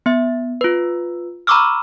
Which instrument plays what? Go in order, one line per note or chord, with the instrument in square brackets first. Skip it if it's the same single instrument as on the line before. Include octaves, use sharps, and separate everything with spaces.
[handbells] B3 E5
F4 B4
A#5 B5 C#6 D6 E6 F6